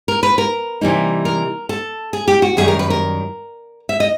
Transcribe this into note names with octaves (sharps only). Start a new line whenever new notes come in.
A#4
B4
A#4
C3 E3 G3 A#3 D#4
A#4
A4
G#4
G4
F#4
F#2 D#3 G3 G#4
A#4
B4
A#4
E5
D#5